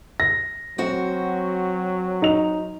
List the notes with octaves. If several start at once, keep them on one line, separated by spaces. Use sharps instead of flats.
A#6
F#3 C4 F#4
D#4 F7